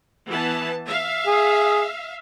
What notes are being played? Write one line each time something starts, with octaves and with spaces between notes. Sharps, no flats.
E3 B3 A5
E5 F5
G#4